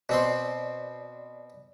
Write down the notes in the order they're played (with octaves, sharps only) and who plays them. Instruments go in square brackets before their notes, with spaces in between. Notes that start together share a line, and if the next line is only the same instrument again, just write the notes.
[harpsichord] B2 C4 C6 [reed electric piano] D5